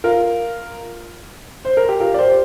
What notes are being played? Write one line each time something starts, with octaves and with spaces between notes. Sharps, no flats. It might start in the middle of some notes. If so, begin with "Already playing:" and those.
F4 A#4
C5
A#4
G4
F4 A#4
D5
G4 C5